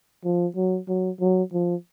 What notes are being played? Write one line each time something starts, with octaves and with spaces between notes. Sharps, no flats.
F3
F#3
F#3
F#3
F3